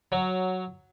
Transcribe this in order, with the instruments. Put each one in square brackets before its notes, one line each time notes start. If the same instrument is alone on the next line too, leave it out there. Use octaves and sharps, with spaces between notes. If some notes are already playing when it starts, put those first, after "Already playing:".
[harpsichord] F#3